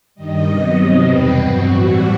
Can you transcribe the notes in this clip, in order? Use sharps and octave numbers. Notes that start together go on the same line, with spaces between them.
G2 D#3 G3 D#5
C3 F#3 B3
C3 D#3 F#3 C4
E2 B2 G3 C4 B4
G2 F#3 C4 F#4
A2 E3 G3